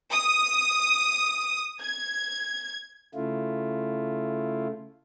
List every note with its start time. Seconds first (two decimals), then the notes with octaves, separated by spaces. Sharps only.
0.12 D#6
1.81 G#6
3.14 C#3 A3 E4 F4